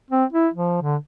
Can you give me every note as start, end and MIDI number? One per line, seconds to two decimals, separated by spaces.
0.10 0.25 60
0.33 0.48 64
0.54 0.79 53
0.82 0.96 50